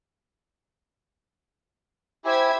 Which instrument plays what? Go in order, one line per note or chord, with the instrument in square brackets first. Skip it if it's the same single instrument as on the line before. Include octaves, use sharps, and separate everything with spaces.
[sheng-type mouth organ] E4 G4 G#5 [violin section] C5 E5 G#6